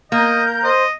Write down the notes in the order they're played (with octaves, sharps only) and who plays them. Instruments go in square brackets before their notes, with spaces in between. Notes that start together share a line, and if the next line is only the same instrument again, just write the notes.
[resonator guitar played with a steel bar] A#3 [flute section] A#4 G6 [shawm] D#5
[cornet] C5 [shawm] D#5